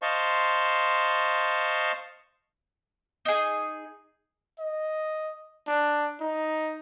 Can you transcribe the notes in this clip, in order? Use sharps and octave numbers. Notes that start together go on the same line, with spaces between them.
C5 D#5 F5 A5 C6 C#6
D#4 G#4
D#5
D4
D#4